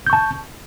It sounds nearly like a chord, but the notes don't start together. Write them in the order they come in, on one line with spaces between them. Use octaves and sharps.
G6 C#6 A5